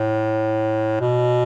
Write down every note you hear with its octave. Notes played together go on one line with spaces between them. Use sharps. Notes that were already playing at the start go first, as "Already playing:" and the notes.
Already playing: A2
B2